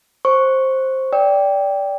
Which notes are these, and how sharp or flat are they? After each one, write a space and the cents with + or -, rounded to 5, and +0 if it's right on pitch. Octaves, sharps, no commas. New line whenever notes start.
C5 +10 C#6 +0
D5 -15 G5 +0 E6 -45